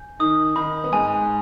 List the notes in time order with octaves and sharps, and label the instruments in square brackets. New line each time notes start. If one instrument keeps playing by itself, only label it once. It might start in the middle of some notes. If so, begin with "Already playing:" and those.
Already playing: [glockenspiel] G#5 G6
[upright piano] D#3 D#4 [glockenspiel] D#6
[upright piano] D#3 D#4 [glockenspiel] B5
[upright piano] B3
[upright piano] G#2 G#3 [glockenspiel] G#5